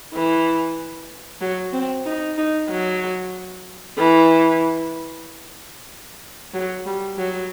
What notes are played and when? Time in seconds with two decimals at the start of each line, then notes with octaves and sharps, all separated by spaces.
0.14 E3
1.41 F#3
1.73 C4
2.06 D#4
2.38 D#4
2.69 F#3
3.98 E3
6.54 F#3
6.86 G3
7.18 F#3